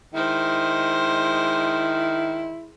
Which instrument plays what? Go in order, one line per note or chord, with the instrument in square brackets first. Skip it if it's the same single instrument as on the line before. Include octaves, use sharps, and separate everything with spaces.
[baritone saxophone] D#3 [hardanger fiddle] G#3 C5 [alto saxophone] E4